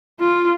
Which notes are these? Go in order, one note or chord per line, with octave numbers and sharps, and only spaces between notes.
F4